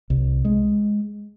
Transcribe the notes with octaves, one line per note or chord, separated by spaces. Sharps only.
C2
G#3